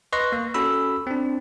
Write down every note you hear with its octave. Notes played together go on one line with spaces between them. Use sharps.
B4 D#5 C6 C#6 F#6 A#6
A#3
C#4 F#4 A4 B5 E6
C4 D4